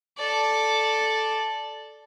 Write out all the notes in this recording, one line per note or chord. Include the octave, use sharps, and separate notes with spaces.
A4 D5